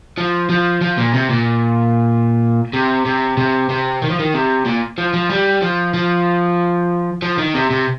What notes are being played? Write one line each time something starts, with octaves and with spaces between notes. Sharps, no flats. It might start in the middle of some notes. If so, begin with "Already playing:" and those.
F3
F3
F3
A#2
C3
A#2
C3
C3
C3
C3
D#3
F3
D#3
C3
A#2
F3
F3
G3
F3
F3
F3
D#3
C3
C3